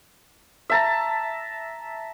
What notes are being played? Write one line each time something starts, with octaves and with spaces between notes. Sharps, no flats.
E5 A5 A#5